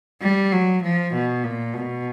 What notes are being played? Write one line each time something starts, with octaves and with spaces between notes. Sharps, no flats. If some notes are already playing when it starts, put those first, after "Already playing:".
G3
F#3
F3
B2
A#2
B2